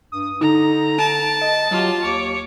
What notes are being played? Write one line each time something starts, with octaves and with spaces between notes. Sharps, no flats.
G2 D#6
D3 D#4 A#5
A5 D7
D#5
F#3 F4 G4
D#2 C#5 D6 C#7